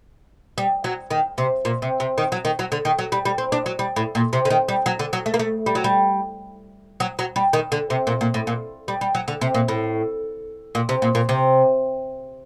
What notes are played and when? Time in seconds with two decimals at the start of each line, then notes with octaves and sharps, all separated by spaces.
0.58 G3
0.84 F#3
1.11 D#3
1.38 C3
1.65 A#2
1.82 C3
2.00 C3
2.18 D#3
2.32 F#3
2.45 D#3
2.59 F#3
2.72 D3
2.85 D#3
2.99 F#3
3.12 G3
3.25 G3
3.38 C4
3.52 D4
3.66 F#3
3.79 G3
3.96 A2
4.15 A#2
4.33 C3
4.45 D3
4.50 D#3
4.68 G3
4.86 F#3
4.99 D3
5.13 F#3
5.26 A3
5.34 A#3
5.39 A3
5.66 G3
5.75 F#3
5.84 G3
7.00 F#3
7.19 F#3
7.36 G3
7.53 D#3
7.72 D3
7.90 C3
8.07 A#2
8.21 A#2
8.34 A2
8.47 A#2
8.88 G3
9.01 G3
9.15 F#3
9.28 D3
9.41 C3
9.55 A#2
9.68 A2
10.75 A#2
10.89 C3
11.02 A#2
11.15 A#2
11.29 C3